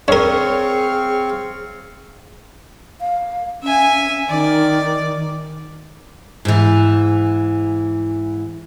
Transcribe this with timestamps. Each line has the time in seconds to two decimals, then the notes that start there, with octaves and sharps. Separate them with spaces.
0.08 C4 D4 G#4 A#4 C#5 F5 C#6
3.01 F5
3.63 C#4 E5 G#5
4.29 D#3 D5
6.45 G#2 E3